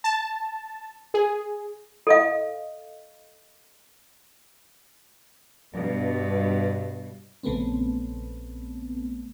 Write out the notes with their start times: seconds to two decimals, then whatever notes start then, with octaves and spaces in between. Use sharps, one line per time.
0.04 A5
1.14 G#4
2.07 A4 D#5 F5
5.72 G2 B2
7.43 A#1 C#3 A3 B3 C4